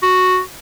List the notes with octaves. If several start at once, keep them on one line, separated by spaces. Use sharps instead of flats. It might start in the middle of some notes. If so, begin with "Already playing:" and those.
F#4